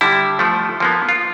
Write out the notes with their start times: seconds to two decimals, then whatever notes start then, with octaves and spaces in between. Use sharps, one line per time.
0.01 D3 G3 E4
0.39 F3 A3
0.80 F3 A#3 B3
1.09 F4